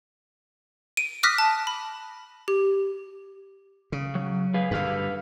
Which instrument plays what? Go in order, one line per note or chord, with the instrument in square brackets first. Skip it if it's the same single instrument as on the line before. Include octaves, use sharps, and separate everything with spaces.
[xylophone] D7 D#7
D6 D#6 F6 F#6 A#6 B6
A5
B5
G4
[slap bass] C#3
[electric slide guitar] F#3
G#4 B4 F5
[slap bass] G2 D3 [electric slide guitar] B4 F5